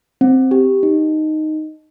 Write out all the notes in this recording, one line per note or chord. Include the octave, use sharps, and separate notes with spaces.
C4
G4
D#4